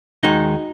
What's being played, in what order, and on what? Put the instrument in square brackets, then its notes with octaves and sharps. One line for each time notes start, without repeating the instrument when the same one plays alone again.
[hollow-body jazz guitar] D#2 D#3 G#3 D#4 F#4